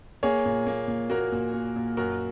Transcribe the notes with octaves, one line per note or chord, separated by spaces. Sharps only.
A#3 G#4 C#5
A#2
A#3
A#2
A#3 F#4 A#4
A#2
A#3
A#2
F#2 F#4 A#4